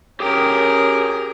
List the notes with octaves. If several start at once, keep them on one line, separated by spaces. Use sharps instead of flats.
C#4 G4 G#4 A#4 G5